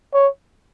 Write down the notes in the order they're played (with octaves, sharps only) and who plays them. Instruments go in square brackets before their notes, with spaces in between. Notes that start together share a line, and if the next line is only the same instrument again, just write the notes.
[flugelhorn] C#5